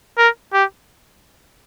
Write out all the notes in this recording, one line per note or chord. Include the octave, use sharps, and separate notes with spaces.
A#4
G4